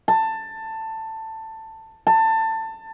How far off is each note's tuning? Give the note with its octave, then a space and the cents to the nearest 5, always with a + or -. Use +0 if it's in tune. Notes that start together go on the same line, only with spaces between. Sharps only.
A5 +15
A5 +20